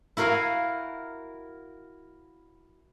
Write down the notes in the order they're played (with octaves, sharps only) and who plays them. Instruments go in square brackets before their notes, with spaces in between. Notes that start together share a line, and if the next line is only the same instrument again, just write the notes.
[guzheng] E4 F#4 A#4 F5 G#5